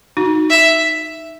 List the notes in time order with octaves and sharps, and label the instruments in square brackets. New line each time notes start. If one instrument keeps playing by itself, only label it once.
[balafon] D#4 F#4
[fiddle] E5